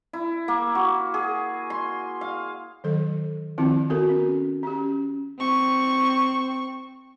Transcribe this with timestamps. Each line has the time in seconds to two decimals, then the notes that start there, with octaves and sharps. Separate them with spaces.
0.13 E4
0.48 A#3
0.75 F#4
1.14 G#4
1.70 C6
2.21 F5
2.84 D#3 F#3 A4
3.58 D#3 F3 C4 E4 F4
3.90 B3 F#4 A4 A#4
4.09 C#4
4.63 C#4 G4
5.39 C4 C#6